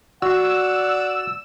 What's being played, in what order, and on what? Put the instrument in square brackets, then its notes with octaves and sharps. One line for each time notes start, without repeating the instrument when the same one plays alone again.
[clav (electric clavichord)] F#4 [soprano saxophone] D5 [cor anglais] F#5 [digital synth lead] E6